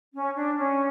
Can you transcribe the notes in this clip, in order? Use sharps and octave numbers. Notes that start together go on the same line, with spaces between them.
C#4
D4
C#4